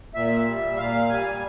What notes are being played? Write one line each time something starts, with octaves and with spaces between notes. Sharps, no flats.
A#2 E5
G3
A#2 F5
G3 G#5